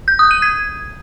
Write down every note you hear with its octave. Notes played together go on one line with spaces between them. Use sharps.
G6
D#6
D#7
G#6